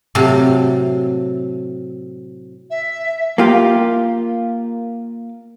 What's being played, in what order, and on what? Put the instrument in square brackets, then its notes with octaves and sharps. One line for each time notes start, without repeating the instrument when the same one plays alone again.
[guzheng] A2 C3 F#3 F5 A5
[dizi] E5
[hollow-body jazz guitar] A#3 F4 G4